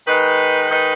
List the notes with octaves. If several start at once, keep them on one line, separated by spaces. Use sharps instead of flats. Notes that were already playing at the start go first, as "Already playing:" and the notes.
D#3 G#3 D#4 B4
D#3 G#3 D#4 B4